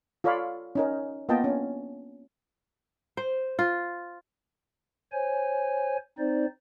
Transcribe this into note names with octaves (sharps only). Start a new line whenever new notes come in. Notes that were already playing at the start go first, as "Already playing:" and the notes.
F4 A4 C#5 D5 F5 B5
C#4 D#4 A#4
A#3 B3 F4 D#5 G5 A5
C#4 D4
C5
F4
C5 C#5 G#5
C4 D#4 C5 D5